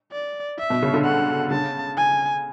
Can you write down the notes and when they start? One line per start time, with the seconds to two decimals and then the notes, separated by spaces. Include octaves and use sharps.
0.12 D5
0.59 E5
0.70 B2
0.83 C#3
0.94 D3
1.05 F#5
1.51 C#3 A5
1.97 G#5